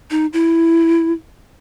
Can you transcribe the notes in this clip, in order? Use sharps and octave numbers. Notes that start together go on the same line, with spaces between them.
D#4
E4